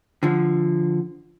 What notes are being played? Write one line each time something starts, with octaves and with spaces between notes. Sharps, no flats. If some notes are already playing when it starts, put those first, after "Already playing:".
D3 F3